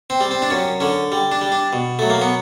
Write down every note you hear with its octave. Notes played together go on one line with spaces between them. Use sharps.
C4
G3
C4
D4
F#2 C#4
D3 C#4
G3
D4
G3
D4
B2
F#3 A3
A#3
B3